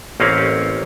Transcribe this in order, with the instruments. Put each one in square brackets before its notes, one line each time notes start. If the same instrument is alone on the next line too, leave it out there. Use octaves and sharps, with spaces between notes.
[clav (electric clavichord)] A1 A#3 C4 C#4 F5